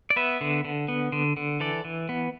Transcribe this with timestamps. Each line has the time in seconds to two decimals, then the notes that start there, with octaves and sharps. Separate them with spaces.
0.10 D5
0.16 B3 B4 E5
0.41 D3
0.65 D3
0.88 B3
1.12 D3
1.37 D3
1.60 E3 A4 D5
1.85 E3
2.09 B3